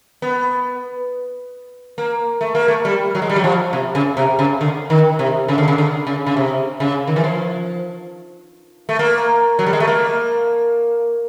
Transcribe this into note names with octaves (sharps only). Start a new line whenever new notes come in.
B3
A#3
A3
A#3
A3
G3
F#3
G#3
G3
F#3
F3
C3
C#3
C3
C#3
D3
D#3
C3
C#3
D3
C#3
D3
C#3
C#3
C3
C#3
D#3
E3
F3
A3
A#3
F#3
G3
G#3
A3
A#3